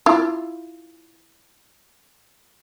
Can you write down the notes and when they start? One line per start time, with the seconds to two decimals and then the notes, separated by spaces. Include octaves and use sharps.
0.06 E4 F4